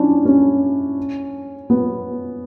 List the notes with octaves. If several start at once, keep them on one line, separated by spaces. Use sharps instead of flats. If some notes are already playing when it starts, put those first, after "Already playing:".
Already playing: C#4 D4 E4
C#4
B3